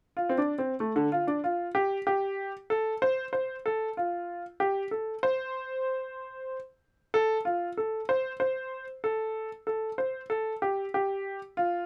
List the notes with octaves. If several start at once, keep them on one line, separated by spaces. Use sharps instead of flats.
F4
C4
D4
C4
A3
D3
F4
D4
F4
G4
G4
A4
C5
C5
A4
F4
G4
A4
C5
A4
F4
A4
C5
C5
A4
A4
C5
A4
G4
G4
F4